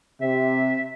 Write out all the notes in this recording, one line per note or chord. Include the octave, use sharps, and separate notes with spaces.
C3 E5